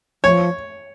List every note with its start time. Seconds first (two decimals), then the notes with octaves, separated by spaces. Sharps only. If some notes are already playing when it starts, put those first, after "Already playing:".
0.24 F3 C#5